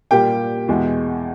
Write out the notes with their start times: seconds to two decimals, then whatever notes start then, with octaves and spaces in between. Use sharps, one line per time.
0.11 A#2 G3 A#3 G4 G5
0.68 E2 B2 G#3